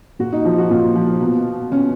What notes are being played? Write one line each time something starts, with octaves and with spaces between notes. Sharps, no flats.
A#2 F#4
D#4
F3
F#4
A#2 F4
F3
B2
B2 C#4